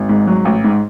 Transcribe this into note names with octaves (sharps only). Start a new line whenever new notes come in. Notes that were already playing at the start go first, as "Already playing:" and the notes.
Already playing: G#1
G#2
F#3
A1
G#2